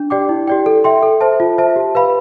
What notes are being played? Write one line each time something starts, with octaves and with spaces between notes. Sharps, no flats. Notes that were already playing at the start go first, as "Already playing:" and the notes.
Already playing: D4
G4 D5 G5 D6
E4
G4 D5 G5
A4
E5 G5 C6
A4
C5 E5 A5
F4
C5 E5 A5
G4
B4 F5 B5